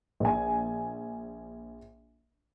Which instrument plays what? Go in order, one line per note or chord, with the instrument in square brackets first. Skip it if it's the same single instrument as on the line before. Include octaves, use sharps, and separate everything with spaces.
[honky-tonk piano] A#1 G#5